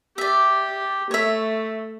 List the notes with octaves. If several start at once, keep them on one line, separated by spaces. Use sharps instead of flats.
G4 D5 E5
A3 C#5 E5